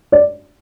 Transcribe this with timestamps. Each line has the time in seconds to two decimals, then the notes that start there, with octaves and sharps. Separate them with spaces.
0.12 D5